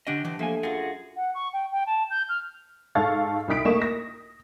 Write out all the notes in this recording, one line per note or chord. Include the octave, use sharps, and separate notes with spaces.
D3 C#4 D4 F#4 G4 D#5
E3 D4 C5 D#5
F3 A3 A#3 G#5
F#2 F4 F#4 G#4 F5
F#5
C#6
G5
G5
A5
G6
F6
G#2 A4 F5 C#6 F6 A6
C2 D#4 D#6 B6 D7
A3 A#3 D#5 C#6 E7
A#6